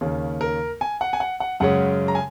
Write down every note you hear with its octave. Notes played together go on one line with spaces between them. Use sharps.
D#2 C#3 A#3 C#4
A#4
G#5
F#5
G#5
F#5
F#5
F#2 C#3 G#3 C#4 F#5
A#5
G#5